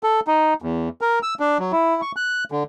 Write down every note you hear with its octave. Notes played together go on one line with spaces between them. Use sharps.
A4
D#4
E2
A#4
E6
D4
F#3
E4
C#6
F#6
D3